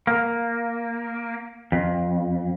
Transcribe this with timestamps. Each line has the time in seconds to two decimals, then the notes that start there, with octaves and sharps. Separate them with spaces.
0.07 A#3
1.72 F2